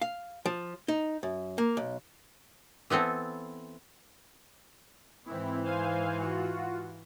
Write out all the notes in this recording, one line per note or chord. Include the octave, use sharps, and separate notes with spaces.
F5
F3
D#4
F#2
A#3
B1
E3 B3 C4 A4
G#2 E3 C4 E4
C5 F5 G#5
F4 F#4